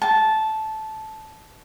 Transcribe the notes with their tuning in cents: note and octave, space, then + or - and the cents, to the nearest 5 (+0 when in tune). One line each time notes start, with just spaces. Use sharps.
A5 -10